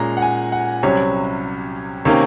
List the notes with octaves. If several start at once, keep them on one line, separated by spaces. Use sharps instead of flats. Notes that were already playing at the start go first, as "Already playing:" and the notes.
Already playing: A#2 G#3 C#4 A#5
F#5
G#5
F#5
C2 C3 F#3 C#4 C#5
C3 D#3 A#3 C#4 C#5